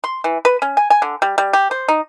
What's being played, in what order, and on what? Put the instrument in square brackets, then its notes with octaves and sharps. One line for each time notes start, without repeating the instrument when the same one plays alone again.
[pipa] C6
E3
B4
C#4
G#5
G#5
D3
G3
G3
G4
C5
D#4